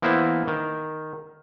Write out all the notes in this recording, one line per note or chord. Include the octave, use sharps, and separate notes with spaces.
E3 A#3 B3 E4 C5
D#3